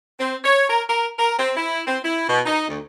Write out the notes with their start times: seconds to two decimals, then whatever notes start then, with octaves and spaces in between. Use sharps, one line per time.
0.19 C4
0.44 C#5
0.69 A#4
0.89 A#4
1.18 A#4
1.38 C4
1.56 E4
1.87 C4
2.04 E4
2.28 B2
2.45 D#4
2.68 D2